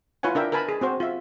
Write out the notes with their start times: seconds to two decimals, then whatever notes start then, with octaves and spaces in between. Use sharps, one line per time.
0.23 E4 F4 B4 C#5 F#5 G#5
0.35 D4 A#4 E5 G5
0.52 A#4 B4 G#5 A5 B5
0.69 G#4
0.81 C4 F#4 C5
1.00 F4 E5